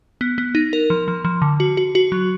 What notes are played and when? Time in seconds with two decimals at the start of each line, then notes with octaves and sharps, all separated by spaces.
0.21 B3
0.38 B3
0.55 D#4
0.73 A#4
0.90 F3
1.08 F3
1.25 F3
1.42 D3
1.60 F#4
1.77 F#4
1.95 F#4
2.12 F#3